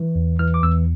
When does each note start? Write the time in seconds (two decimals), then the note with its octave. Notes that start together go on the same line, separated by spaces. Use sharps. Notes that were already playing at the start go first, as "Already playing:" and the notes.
Already playing: E3
0.15 E2
0.39 E3 F6
0.54 D6
0.63 E2 E6